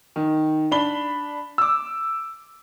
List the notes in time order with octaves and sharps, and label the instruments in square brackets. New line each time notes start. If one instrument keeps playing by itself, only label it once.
[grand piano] D#3
D4 B5 G7
D6 E6